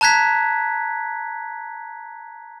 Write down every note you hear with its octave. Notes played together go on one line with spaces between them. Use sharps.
A5 A#5 F#6 G#6 B6